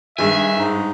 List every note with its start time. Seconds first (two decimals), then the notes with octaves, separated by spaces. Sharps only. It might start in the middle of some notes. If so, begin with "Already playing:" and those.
0.18 G2 D#3 G#3 E5 G#5
0.58 G#2 D#4